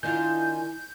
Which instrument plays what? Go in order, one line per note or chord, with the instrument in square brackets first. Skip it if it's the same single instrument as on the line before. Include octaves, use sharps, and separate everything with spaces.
[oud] D#3 D4 F4 [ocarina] E4 [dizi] G#5 [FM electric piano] G6